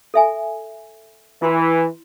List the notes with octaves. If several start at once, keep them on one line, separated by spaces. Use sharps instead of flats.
A4 E5 G#5
E3 E4 C6